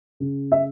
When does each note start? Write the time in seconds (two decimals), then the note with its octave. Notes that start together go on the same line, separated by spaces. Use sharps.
0.20 C#3
0.52 E5